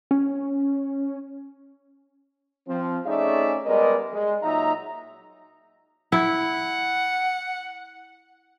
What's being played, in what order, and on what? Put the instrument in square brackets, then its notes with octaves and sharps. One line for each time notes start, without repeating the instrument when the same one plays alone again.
[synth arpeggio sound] C#4
[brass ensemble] F3 C4
A3 C#4 D#4 G#4 D5 E5
G3 G#3 B3 A#4 D5 D#5
G#3
A#2 F#3 D#4 E5 A#5
[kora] E4 [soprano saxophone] F#5